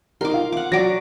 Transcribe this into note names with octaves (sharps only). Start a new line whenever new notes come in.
D#4 A#4 C6 D6
F4 F5
F#5 D6
F#3 D5 F#5 D6 A#6